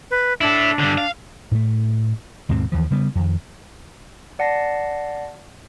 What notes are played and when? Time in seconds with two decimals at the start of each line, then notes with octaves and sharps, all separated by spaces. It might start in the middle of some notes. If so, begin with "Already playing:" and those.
0.11 B4
0.41 D4 E4 A4
0.79 G2 D3
0.98 F5
1.51 A2 A3
2.49 D#2 G#2 B2 C4
2.72 D#2 E3 F3
2.90 C#3 G3 B3
3.15 F2 D#3
4.39 D5 F#5 A5 A#6 C7